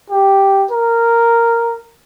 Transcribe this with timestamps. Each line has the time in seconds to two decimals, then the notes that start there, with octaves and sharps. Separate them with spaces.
0.10 G4
0.71 A#4